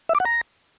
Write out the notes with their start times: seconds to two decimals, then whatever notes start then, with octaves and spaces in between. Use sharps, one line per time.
0.09 E5
0.15 D6
0.20 F#5
0.25 A#5